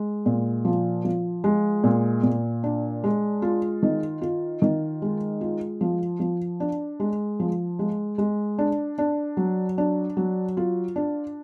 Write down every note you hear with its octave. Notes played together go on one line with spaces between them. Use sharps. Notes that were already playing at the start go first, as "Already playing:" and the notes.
Already playing: G#3
A#2
F3
F3
G#3
A#2
A#2
D4
G#3
F4
D#3
F4
D#3
G#3
F4
F3
F3
D4
G#3
F3
G#3
G#3
D4
D4
F#3
D4
F#3
F4
D4